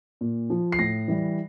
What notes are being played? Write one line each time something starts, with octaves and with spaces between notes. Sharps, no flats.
A#2
F3
C7
A2 A#6
E3 G3